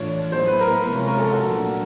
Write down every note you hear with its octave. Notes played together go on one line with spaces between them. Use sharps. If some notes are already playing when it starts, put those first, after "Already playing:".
Already playing: A2 E3 A3 D4 F4 C#5
A2 F#3 B3 E4 C5
B4
A#4
C3 F3 G#3 C#4 F4
A#4
A4
F#4
A#2 F#3 A3 D4